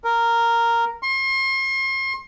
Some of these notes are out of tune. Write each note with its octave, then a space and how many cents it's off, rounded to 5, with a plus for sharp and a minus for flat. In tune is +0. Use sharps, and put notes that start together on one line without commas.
A#4 -5
C6 +40